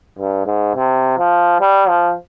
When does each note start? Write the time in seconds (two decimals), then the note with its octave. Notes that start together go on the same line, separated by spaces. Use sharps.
0.19 G2
0.46 G#2
0.76 C3
1.18 F3
1.61 G3
1.89 F3